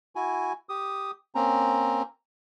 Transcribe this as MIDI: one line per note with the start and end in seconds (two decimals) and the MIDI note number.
0.16 0.53 64
0.16 0.53 66
0.16 0.53 80
0.69 1.11 67
0.69 1.11 87
1.35 2.03 58
1.35 2.03 60
1.35 2.03 61
1.35 2.03 82